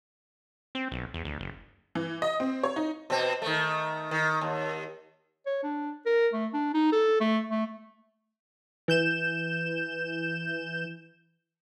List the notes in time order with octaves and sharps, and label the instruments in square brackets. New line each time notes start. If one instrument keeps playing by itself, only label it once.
[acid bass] C4
B1
E2
D2
F#1
[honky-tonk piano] E3
D#5
C4
C#5
D#4
[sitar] B2 C4
D#3 A3
D#3
D#2
[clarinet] C#5
D4
A#4
A3
D4
D#4
A4
A3
A3
[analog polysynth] E3 G6 E7